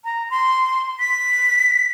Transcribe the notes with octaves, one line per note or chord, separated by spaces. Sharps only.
A#5
C6
B6